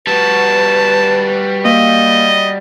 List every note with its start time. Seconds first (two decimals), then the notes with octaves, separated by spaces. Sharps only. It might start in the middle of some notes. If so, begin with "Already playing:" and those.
0.07 G3 F#4 B4 A5
1.65 A#3 D#5